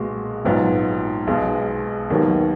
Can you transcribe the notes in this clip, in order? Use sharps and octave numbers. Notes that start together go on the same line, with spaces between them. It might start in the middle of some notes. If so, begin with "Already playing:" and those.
Already playing: B1 A#2 G#3 B3 F#4
A#1 G#2 F#3 B3 F4
B1 B2 G#3
D#2 D#3 F#3 B3